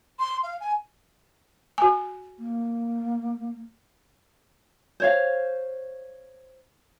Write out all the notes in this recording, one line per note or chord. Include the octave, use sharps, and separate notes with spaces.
C6
F5
G#5
F#4 G#5
A#3
C5 C#5 F5